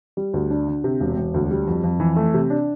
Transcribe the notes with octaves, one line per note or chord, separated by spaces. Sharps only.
G3
D2
D4
D3
C3
E1
E1
D2
G3
F2
F2
E3
A3
C3
D4